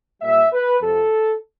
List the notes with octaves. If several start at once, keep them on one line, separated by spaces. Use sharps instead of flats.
A#2 G3 A#3 E5
B4
F2 C3 F3 A4